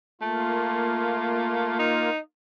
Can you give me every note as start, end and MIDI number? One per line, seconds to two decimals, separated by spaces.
0.21 1.74 57
0.21 2.09 58
0.21 2.09 65
1.79 2.18 63